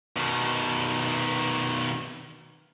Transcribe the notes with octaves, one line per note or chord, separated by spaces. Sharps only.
B2 D#3